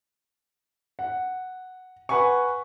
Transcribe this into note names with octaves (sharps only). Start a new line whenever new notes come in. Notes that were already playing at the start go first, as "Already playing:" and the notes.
F#5
B4 F#5 G#5 C#6